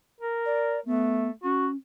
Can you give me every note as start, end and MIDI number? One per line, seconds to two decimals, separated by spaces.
0.21 0.78 70
0.46 0.80 74
0.86 1.31 57
0.86 1.29 59
1.44 1.76 61
1.44 1.67 66